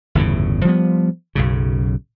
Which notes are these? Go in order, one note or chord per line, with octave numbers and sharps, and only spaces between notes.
G1 E2 A2 C#3
F3 G3 B3
B1 F#2 C#3